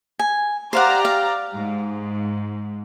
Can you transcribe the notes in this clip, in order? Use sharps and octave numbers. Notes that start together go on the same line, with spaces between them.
G#5
G4 C5 D5 F5 F#5 A#5
F5
G#2